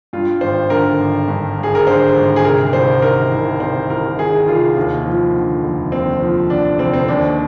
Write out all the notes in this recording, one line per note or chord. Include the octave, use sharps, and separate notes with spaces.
G2 F4
G#1 C5
D3 A#4
G#1
G2
G#1
G#4
A#4
D3 C5
G#1
G#4
C3 A#4
C2 C5
D#3 A#4
C2
C3 C5
C2 A#4
D#3 G#4
C2 F4
D#2
F3
D3
F1
D#2 C4
F3
D3 D4
D4
F1 C4
C4
D#2 D4